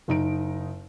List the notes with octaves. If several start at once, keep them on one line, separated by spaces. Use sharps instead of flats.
F#1 D#4 D7